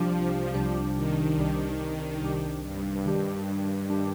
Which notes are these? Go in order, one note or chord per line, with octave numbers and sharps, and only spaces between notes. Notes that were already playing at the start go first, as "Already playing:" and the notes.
Already playing: C2 C3 F3 G3 D4 G4
C2 C3 G3 D4 G4
D#3
C2 C3 G3 D4 G4
C2 C3 G3 D4 G4
G2
D#3 G3 D4 G4
D#3 G3 D4 G4